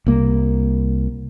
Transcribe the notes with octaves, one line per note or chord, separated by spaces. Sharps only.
C2 A#3